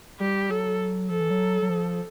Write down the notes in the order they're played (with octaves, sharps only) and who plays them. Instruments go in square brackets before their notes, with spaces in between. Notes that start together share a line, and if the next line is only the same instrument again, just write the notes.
[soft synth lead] G3 [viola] G4
[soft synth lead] F#3 [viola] A4
[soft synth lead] F3 [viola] A4
[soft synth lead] E3
F#3
F#3
F3